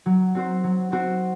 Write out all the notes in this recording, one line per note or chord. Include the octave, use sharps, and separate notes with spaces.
F#3
C4 F#4 C5
F#3
C4 F#4 C5